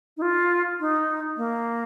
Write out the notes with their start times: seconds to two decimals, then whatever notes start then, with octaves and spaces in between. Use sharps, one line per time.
0.17 D#4
0.22 F4
0.80 D#4
1.37 A#3